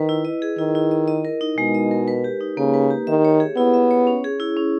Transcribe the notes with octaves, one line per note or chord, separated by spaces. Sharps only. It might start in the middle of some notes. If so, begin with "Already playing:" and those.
Already playing: D#3 B4
E4
D#5
G#4
D#3 E4
E4
D#5
D#5
A#4
D#4
B2 G#3
D#5
A#4
B4
G4
D#4
C#3 A#3
B4
G4
D#3 E5
C#5
G#4
B3 E4
E5
C#5
C#4
G#4
E4
C#4